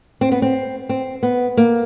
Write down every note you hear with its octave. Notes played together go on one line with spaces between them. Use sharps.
C4
B3
C4
C4
B3
A#3